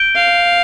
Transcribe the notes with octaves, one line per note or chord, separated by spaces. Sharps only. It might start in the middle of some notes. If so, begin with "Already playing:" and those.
Already playing: G6 D7 G7
F5